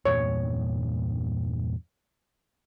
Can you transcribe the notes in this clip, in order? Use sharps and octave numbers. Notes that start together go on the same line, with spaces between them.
E2 G2 A#2 C#5